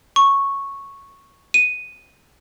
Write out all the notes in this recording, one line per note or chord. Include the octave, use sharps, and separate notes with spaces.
C#6
D#7